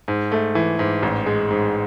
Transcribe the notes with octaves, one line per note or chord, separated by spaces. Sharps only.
G#2
A3
E3
G#2
A1
G#3
G#2